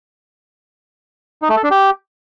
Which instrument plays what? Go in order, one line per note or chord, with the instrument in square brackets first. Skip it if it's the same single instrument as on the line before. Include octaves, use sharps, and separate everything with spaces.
[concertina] D#4
A3
A4
D4
G4